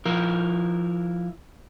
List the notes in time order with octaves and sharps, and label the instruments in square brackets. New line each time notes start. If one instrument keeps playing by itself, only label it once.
[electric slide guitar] F3 E4 A#4